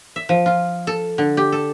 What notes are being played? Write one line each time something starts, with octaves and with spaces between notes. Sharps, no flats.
E5
F3
F4
A4
D3
G4
A4